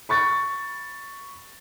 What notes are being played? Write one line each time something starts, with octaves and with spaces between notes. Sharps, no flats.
B5 C#6 A6